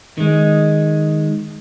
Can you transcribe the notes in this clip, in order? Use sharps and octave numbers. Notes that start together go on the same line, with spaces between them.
D#3 G#3